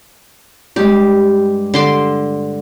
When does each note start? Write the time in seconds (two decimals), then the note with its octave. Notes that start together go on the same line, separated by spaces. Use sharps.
0.76 G2 G#3 G4
1.74 D3 C6 D6